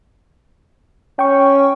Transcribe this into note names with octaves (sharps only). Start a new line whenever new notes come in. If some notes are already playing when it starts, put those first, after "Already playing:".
C#4 G5 C#6